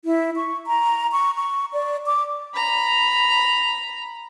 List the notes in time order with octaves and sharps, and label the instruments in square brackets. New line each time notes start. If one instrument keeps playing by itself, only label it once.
[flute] E4
C#6
A#5
C#6
C#6
D5
D6
[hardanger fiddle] A#5 B5